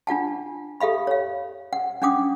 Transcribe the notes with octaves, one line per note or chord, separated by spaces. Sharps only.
D4 F4 F#5 A5
G4 A4 E5 F5 B5
C#5 F5
F#5
C#4 D4 F#5 D6 D#6